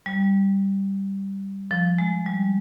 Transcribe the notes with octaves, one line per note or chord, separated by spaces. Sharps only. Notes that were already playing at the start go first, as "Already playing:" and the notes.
G3
F3
G#3
G3